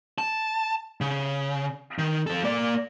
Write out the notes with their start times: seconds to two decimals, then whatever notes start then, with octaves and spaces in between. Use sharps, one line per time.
0.18 A5
1.01 C#3
1.99 D#3
2.27 F3 A4
2.44 A#3 D5